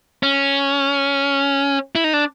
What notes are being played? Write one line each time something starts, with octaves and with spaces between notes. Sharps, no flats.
C#4
E4
D#4
D4